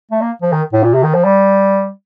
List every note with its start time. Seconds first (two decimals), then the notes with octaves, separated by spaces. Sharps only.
0.11 A3
0.22 A#3
0.42 F3
0.52 D#3
0.73 A2
0.83 A#2
0.94 C3
1.04 D#3
1.14 F3
1.25 G3